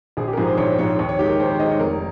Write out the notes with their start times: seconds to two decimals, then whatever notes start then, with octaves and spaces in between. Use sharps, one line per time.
0.17 A#1 G#4
0.27 G4
0.33 A#4
0.37 G#2 F3 G#4
0.47 C5
0.57 A#1 C#5
0.79 G#2 F3 C#5
0.99 D#2 C#5
1.09 C#5
1.19 D#3 G#3 G4
1.29 A#4
1.39 D#2 C5
1.50 C5
1.59 D#3 D#5
1.62 G#3
1.70 C#5
1.80 F1 A#4